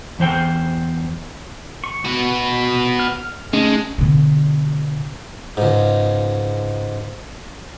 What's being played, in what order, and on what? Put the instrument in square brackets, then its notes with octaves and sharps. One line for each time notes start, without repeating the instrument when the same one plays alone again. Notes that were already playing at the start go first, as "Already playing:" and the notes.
[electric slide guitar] E2 E3 C5 G5
[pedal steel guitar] C#6
[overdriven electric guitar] B3 F#4
[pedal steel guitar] F6
[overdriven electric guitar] G#3 [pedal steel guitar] A3 C#4 D#4
[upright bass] B2 D3
[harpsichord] C#2 G#2